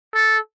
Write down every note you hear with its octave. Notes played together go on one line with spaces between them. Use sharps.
A4